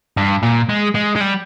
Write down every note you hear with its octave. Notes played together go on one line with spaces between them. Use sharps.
G2
A#2
G#3
G#3
G#3
G3